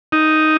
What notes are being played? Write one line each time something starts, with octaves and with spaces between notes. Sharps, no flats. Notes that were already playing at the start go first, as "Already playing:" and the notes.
D#4